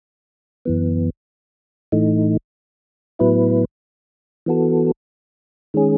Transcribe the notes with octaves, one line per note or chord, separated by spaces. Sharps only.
F#2 E3 B3
A2 E3 A3 D#4
A2 F#3 B3 E4 B4
E3 B3 F#4 A4
D#3 G#3 C#4 G#4